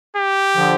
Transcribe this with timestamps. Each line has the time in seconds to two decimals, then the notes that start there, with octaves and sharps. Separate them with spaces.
0.17 G4
0.55 D3 F3